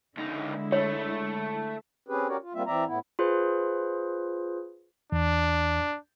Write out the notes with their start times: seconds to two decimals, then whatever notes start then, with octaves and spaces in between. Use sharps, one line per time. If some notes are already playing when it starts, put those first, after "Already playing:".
0.17 C#2 D3 G#3 D#4 E4
0.72 A3 C#5
2.09 C4 C#4 G4 G#4 B4
2.28 C#4 F#4 G4 A#4 C#5 D5
2.42 F4
2.55 G3 A#3 C4 F4 E5
2.67 E3 C4 D5 E5 A#5
2.87 A2 B3 E4
3.19 F4 G#4 B4 C5
5.12 E2 D4